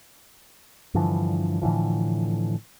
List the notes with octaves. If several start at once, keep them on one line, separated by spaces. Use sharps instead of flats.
G2 D3 E3 F3
A2 D3 E3 F3